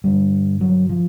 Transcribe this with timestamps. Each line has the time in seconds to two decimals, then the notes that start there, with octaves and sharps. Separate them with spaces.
0.04 G2 D3 G3
0.61 F#3
0.89 F3